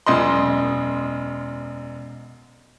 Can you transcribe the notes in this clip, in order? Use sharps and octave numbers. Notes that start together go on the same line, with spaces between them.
E1 F#2 D#5 C6